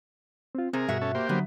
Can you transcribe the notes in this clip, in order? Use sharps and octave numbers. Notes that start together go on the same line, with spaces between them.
C4 F4
C3 C4 G#4 A#4
G2 B2 F#4 E5
C#4 A4
A#3 G4 C5
D3 F#3 B3